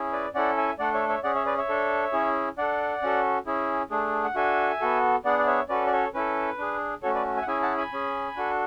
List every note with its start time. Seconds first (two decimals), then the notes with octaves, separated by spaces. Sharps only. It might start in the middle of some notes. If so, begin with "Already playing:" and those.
Already playing: C#4 E4 G#4
0.12 B4 D5
0.34 C#4 E4 A4 D5 F#5
0.57 E5 G#5
0.79 A3 D4 A4 D5 F#5
0.94 C#5 E5
1.09 C#5 E5
1.24 C#4 G#4 D5 F#5
1.35 C#5 E5
1.46 B4 D5
1.58 C#5 E5
1.69 D4 A4
2.13 C#4 E4 G#4
2.58 D4 A4 D5 F#5
3.02 C#4 F#4 A4
3.47 C#4 E4 G#4
3.91 A3 D4 G#4
4.24 F#5
4.35 D4 F#4 A4 E5 G#5
4.80 B3 F#4 A4
5.25 B3 D4 G#4 D5 F#5
5.39 D5
5.47 C#5 E5
5.69 C#4 F#4 A4 B4 D5
5.87 D5
5.92 A4 C#5
6.14 C#4 E4 A4 B4
6.58 D4 G#4
7.03 A3 C#4 F#4 A4 C#5
7.15 B4 D5
7.37 E5 G#5
7.42 F#5
7.47 C#4 E4 G#4 E5 G#5
7.62 F#5 A5
7.78 G#5 B5
7.93 C#4 G#4
8.36 D4 F#4 A4